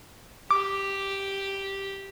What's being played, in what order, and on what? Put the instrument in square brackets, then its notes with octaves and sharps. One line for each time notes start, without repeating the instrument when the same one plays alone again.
[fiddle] G4 [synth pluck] D6